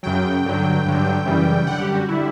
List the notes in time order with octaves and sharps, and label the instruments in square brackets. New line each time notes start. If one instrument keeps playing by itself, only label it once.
[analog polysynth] F#2 C#3 F#3 G5
G2 D3 F#3
G2 D3 F#3
F#2 C#3 E3 G3
F#2 D3 G3 F#5
G4
F#4
D3 G3 E4